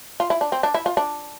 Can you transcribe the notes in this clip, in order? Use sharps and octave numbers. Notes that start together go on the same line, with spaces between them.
F4
E4
D4
C4
D4
E4
F4
D4